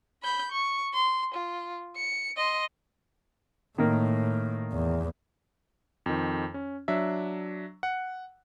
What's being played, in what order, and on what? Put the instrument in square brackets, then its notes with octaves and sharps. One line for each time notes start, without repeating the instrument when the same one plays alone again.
[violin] B5 G6
C#6
C6
F4
C#7
D#5 C6
[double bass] A2 [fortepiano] D#3 A#3
[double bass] E2
[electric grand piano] F2 D#3
C#4
F#3 D4 E5
F#5